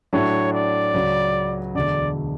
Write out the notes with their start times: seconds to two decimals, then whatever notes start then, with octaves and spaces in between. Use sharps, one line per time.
0.13 A2 F#3 A3 D4 C#5
0.53 D5
0.94 C#2 C#3 F#3
1.75 E1 D2 D3 D5